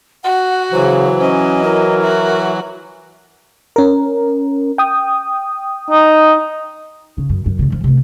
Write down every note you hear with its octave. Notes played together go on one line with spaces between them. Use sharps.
F#4 F#5
C#3 E3 F#3 C5
C#4 D#5
E4 A#4
F#4 E5
C#4 A#4
G5 D#6
D#4
C#3
F#2
F#2
C#2 C#3
F3
C3 A3